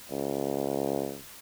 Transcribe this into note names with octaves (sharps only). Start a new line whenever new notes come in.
C#2